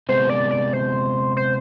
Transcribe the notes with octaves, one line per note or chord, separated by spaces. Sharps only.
C3 G#3 B3 C5
D5
D5
C5
C5